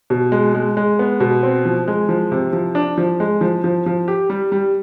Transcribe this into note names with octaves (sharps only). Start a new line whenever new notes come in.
B2
G#3
G#3
G#3
B3
B2
C4
F3
G#3
F3
C3
F3
D4
F3
G#3
F3
F3
F3
G4
G3
G3